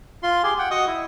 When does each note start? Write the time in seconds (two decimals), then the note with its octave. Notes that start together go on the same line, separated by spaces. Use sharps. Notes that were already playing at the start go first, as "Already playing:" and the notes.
0.23 F4 C6
0.44 G4 G#4 G#5 C6
0.59 F#5 G5
0.71 F#4 D#5 C#6 D#6
0.87 E4